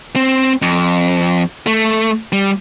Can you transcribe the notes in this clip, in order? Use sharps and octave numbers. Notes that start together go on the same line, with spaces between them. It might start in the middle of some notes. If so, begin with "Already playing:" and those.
C4
F2
A3
G3